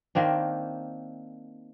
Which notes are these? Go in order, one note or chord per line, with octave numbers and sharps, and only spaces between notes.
D#3 A#3 C4 D4